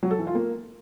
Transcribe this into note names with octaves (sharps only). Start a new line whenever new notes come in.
F#3
A4
E3
F4
A#3